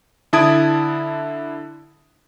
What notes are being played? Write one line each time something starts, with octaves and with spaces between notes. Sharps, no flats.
D3 E4 A5 D#6 G#6 D7